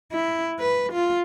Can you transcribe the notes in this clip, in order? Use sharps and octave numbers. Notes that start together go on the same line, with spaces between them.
E4
B4
F4